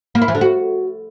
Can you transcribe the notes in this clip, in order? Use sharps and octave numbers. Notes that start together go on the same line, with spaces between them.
A#3
E4
E3
D3
F#4